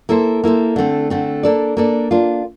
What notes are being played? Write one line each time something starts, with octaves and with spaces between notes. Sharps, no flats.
A#3 E4 A4 C5
A#3 E4 A4 C5
D3 A3 C4
D3 A3 C4
A#3 D4 A4 D5
A#3 D4 A4 D5
A#3 D4 F4